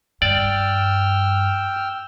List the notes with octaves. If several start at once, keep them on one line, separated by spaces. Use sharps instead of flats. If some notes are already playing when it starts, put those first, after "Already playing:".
G2 D5 G5 E6 F6